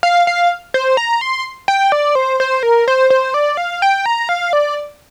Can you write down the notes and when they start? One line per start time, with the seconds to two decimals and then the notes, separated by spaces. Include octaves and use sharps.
0.03 F5
0.27 F5
0.74 C5
0.97 A#5
1.21 C6
1.68 G5
1.92 D5
2.15 C5
2.40 C5
2.63 A#4
2.88 C5
3.10 C5
3.34 D5
3.57 F5
3.82 G5
4.06 A#5
4.29 F5
4.53 D5